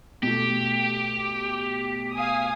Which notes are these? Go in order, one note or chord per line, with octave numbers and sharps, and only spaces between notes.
B2 A3 G4
F5 G#5 D#6